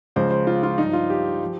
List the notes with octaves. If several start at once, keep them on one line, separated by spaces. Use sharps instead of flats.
C#2 C#3 F3 C5
C5
F4
F4
G2 F3 D#4
F4
G4
F3